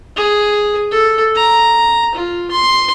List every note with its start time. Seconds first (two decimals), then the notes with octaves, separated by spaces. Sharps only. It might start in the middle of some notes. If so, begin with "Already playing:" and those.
0.16 G#4
0.91 A4
1.35 A#5
2.15 F4
2.51 C6